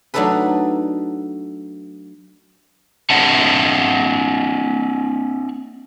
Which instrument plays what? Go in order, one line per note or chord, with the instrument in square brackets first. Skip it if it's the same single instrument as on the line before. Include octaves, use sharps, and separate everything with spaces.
[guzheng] F#3 A3 D4 D#4 A4 B4
[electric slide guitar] C4 D4 C#5 E5 F#5 A5